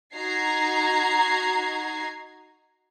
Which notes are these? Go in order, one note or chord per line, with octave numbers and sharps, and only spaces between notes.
D#4 F#4 A#5 G#6 C7